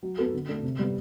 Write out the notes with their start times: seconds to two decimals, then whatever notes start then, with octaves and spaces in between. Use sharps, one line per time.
0.03 F#3
0.18 B3 F#4 A4
0.34 D3
0.49 A3 D4 A4
0.63 C3
0.79 G3 B3